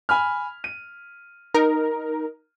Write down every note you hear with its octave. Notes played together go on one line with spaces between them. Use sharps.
G#5 B5 F6
D#7
D#4 A#4